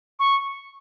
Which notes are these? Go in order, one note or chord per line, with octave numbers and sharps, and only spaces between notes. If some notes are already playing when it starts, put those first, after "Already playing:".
C#6